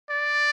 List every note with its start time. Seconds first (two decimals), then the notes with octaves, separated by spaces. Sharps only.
0.10 D5